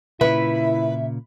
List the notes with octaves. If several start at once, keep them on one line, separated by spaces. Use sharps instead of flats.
A#2 C#3 E4 B4 E5